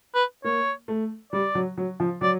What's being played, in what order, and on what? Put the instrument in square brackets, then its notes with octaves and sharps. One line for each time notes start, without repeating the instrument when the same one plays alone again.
[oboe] B4
[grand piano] A#3 [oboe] C#5
[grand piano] A3
[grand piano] G3 [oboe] D5
[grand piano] F#3
F#3
F3
[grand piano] F#3 [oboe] D5